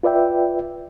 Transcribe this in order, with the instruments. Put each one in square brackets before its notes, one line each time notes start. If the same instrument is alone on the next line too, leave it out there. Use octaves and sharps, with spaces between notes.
[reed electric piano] F4 B4 D5 E5 G5